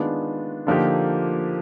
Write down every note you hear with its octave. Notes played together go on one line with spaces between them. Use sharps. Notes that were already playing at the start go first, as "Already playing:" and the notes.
Already playing: D#3 G#3 B3 D4 F4
D3 F3 A#3 D#4 G4